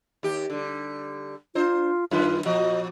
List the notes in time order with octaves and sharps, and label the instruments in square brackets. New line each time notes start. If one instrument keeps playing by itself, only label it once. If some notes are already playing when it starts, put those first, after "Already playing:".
[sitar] D#2 G4
D3 G3
[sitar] D4 C5 [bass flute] F4
[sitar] F#2 D#3 B4 [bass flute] F4
[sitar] A#2 F3 F#4 [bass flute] D#5